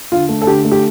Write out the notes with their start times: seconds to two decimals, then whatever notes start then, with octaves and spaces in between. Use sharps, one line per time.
0.12 D3 F4
0.29 A3
0.42 A4
0.47 D3 G4
0.65 A3
0.72 G4